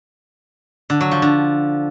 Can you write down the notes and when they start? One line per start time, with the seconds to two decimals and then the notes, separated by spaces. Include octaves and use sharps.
0.90 D3
1.01 F#3
1.11 F3
1.22 D3